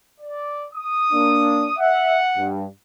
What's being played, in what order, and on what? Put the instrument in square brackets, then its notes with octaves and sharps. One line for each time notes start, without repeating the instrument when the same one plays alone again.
[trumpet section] D5
D#6
[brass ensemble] A#3 D4
[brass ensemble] E5 [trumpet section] F#5
[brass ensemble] G2